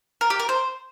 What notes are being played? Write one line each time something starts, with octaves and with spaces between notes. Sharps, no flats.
A#4
G4
A#4
C5